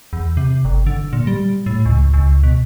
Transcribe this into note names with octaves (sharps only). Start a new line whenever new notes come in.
E2
C3
G1
D3
A#2
G3
A2
C#2
C#2
B2